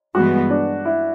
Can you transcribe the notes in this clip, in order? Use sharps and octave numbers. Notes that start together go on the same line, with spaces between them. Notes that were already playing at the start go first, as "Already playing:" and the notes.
G2 E3 G#3 B3 F#4
D4
E4